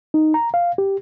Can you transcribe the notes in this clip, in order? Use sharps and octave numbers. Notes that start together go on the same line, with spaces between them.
D#4
A#5
F5
G4